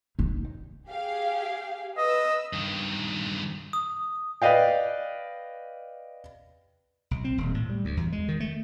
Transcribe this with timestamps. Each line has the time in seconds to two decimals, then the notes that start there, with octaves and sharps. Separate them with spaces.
0.19 D#4
0.90 G4 G#4 F5
1.97 B4 D#5 E6
2.53 G2 D#3
3.73 D#6
4.42 B4 D5 D#5 F5 G5
7.11 B1
7.24 C4
7.38 D#1
7.54 A2
7.70 G3
7.85 D2
7.97 E2
8.12 G#3
8.28 D#3
8.40 A3